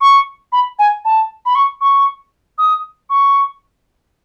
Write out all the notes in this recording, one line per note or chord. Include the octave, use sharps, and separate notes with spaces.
C#6
B5
G#5
A5
B5
C#6
C#6
D#6
C#6